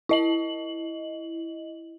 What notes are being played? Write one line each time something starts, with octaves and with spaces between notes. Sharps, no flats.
E4 D#5 F#7